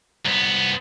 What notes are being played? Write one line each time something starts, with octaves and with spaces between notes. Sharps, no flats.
C2 B3